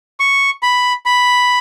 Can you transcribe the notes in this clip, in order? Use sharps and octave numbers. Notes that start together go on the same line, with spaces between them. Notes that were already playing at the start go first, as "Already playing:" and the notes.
C#6
B5
B5